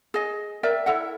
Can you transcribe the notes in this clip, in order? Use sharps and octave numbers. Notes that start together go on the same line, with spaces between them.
G#4 D#5
A#4 D5 E5 G5
E4 A4 E5 F#5